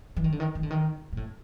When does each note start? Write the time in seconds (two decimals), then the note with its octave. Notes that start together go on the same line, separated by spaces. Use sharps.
0.16 E3
0.24 D#3
0.32 D3
0.40 D#3
0.55 D#3
0.63 D3
0.70 D#3
1.12 A#2
1.17 A2